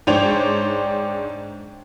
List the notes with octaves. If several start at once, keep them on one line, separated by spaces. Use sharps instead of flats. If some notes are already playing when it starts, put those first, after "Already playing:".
G#2 D4 C5 C#5 G5 F7